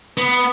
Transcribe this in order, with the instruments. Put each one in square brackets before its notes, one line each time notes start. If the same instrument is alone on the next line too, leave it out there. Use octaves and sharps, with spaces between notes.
[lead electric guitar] B3